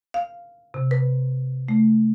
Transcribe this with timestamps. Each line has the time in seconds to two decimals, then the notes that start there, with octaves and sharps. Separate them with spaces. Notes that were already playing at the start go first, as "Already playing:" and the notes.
0.14 F5
0.74 C3
0.91 B4
1.69 A3